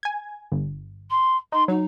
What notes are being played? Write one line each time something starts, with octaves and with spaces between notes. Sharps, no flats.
G#5 G#6
G1
C6
D#4 C6
F#3 D#4